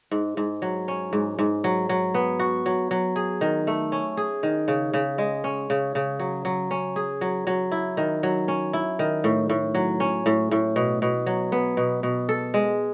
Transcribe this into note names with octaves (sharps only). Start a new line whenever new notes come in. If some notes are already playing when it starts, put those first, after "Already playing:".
G#2
G#2
F#3
C#4
G#2
G#2
F#3
F#3
B3
F#4
F#3
F#3
G#4
D#3
A3
C#4
G#4
D#3
C#3
C#3
G#3
C#4
C#3
C#3
F#3
F#3
C#4
G#4
F#3
F#3
E4
D#3
F#3
C#4
E4
D#3
A2
A2
F#3
C#4
A2
A2
B2
B2
F#3
B3
B2
B2
A4
G#3